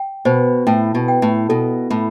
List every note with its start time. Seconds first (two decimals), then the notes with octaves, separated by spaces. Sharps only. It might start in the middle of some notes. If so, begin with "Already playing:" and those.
Already playing: G5
0.25 B2 C5
0.67 A2 G5
0.95 B2
1.08 G5
1.22 A2
1.49 B2 A4
1.90 A2 B5